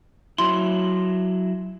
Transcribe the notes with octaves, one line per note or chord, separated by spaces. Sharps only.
F#3 E4 C6